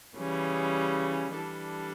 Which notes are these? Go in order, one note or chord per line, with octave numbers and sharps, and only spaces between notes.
C#3 E3 G3 C#4
E3 G3 D4 A4